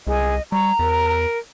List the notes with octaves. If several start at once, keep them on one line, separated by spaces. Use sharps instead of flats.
C2 G#4 D#5
G3 A#5 C#6
E2 A#4